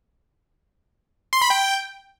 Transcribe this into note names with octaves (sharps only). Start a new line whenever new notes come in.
C6
B5
G5